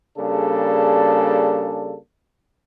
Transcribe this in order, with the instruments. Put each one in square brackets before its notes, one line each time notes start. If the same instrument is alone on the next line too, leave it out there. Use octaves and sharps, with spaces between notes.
[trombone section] C#3 G3 A#3 D4 G#4 A4